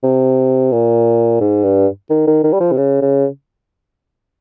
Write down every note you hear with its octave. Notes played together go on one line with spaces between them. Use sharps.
C3
A#2
G#2
G2
D#3
D#3
D#3
G3
F3
C3
C#3
C#3